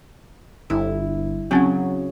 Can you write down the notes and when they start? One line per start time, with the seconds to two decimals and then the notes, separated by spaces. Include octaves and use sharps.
0.70 G1 E4
1.51 C#3 F#3 C4 C#4 F#5